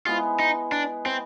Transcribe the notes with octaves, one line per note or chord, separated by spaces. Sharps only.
G#3 B3 E4 F4
D#4
D4
C4